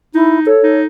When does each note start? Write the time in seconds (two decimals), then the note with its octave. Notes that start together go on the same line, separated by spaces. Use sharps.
0.15 D#4 E4
0.47 A4 C#5
0.64 D#4